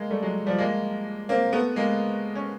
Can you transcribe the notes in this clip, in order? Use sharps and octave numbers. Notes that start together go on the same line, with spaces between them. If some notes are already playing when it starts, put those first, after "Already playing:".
Already playing: G#3 A#3
G3 A3
F#3 G#3
F3 G3
G#3 A#3
A#3 C4
A3 B3
G#3 A#3
C#4